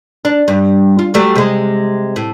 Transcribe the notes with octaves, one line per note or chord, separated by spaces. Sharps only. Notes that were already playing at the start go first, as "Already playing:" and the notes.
D4
G2
F4
F#3 G3 A3
C3 G#3
A2